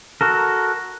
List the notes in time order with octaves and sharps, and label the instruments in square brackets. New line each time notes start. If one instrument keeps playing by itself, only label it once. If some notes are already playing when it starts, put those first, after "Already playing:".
[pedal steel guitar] F#4 A4 A#4